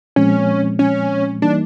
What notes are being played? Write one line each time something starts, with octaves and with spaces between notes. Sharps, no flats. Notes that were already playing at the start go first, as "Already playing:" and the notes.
A#2 F3 G#3 C4 C#4
C#4
E3 G3 A#3 D4 D#4